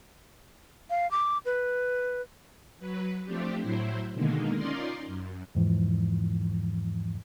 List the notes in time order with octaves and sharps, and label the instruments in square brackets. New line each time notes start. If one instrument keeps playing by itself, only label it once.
[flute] F5
D6
B4
[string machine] F#3 B4
F3 A3 C4 D4 G4
A2 F#3 E4 C5
B2 D3 D#3 G#3 A#3 D#4
C#4 D#4 F4 A#4 D5 C6
F#2
[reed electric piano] E2 G#2 E3 F3